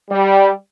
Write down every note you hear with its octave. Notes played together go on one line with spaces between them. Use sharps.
G3